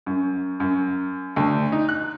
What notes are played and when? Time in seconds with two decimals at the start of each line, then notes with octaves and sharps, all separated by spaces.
0.06 F#2
0.60 F#2
1.36 D2
1.72 D#4
1.89 F#6